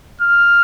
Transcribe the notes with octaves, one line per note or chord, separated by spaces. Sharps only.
F6